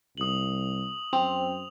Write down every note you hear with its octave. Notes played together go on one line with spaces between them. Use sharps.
C2 D#6 F#7
F#2 C4 F7